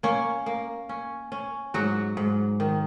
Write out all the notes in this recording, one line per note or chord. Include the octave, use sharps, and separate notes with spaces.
A#3 C#4 C#5
A#3
C#4
C#4
G#2 F#3 F#4
G#2
D#3